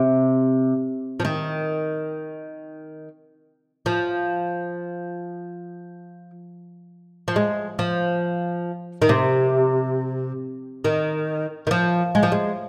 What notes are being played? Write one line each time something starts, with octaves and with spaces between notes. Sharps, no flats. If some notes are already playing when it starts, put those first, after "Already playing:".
Already playing: C3
F3
D#3
F3
F3
G#3
F3
D#3
C3
D#3
D#3
F3
G#3
F3
G#3